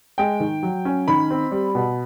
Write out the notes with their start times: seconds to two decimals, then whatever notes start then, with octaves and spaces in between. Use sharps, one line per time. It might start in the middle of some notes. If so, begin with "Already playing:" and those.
0.18 G#3 G5
0.40 D#3
0.63 F#3
0.85 C#4
1.08 D#3 B5
1.31 C4
1.52 G3
1.75 B2